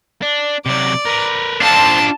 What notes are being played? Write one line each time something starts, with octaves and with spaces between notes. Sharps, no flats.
D4
C3 F#3 D5
A#4 B4
C4 D4 F4 A4 A5